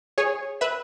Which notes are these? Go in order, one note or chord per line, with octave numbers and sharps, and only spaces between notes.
G#4 C#5
B4 E5